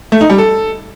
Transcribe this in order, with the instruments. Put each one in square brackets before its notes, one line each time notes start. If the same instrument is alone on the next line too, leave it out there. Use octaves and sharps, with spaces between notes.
[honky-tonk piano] A3
D#4
G3
A4